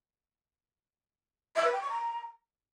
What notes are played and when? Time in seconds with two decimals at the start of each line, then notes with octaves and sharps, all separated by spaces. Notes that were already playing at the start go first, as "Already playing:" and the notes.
1.55 E5
1.64 B4
1.72 G5
1.81 C#6
1.89 A#5